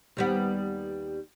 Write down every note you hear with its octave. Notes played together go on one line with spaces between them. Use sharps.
D#2 G3 B3